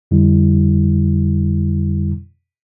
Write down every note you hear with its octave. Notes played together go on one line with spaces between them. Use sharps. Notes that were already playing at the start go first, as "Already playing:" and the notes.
F2 D3 G3 E4